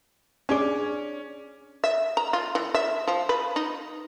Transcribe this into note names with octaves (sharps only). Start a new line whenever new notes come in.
C#4 D4 G#4 D5
E5
A#5
F4
E3
E5
F3
B4
D#4